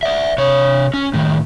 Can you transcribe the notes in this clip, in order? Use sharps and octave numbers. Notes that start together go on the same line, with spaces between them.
D5 E5
C3 C#5
C#4
A2 D#3